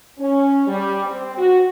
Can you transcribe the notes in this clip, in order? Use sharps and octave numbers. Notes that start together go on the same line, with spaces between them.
C#4
G3
C4
F#4